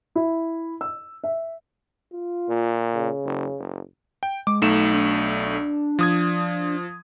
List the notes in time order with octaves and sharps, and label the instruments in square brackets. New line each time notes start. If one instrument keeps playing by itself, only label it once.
[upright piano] E4
E6
E5
[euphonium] F4
[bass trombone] A#2
[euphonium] C#3
[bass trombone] F#1
F#1
[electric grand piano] G5
[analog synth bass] G#3 [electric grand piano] D6
[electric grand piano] B1 A3 E7 [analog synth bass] D#4
[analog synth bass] D4
[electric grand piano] F3 D#6 G#6